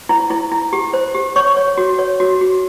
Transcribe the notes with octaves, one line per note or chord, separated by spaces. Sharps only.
E4
E4
E4
G4
C5
G4
C#5 C#6
C#5
F#4
C#5
F#4
F#4